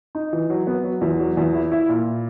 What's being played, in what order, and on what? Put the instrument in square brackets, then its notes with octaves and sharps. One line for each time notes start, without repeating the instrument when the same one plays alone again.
[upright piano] D#4
E3
F#3
B3
F#3
E2
F#3
E2
E4
E4
A#2